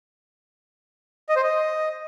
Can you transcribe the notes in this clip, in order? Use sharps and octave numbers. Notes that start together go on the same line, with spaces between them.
D#5
C5
D#5